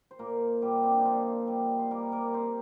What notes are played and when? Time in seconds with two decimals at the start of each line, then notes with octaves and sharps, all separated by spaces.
0.11 C5
0.19 A#2 A#3 A#4
0.62 A#2 G3 G4
0.83 C4
0.91 D4
0.98 D#4
1.05 A#2 F3 F4
1.47 G3
1.79 C5
1.91 G3 A#3 A#4
2.12 A#3 A#4
2.34 G3 C4 C5